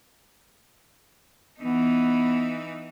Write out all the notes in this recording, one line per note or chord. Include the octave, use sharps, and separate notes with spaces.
E3 B3 D#4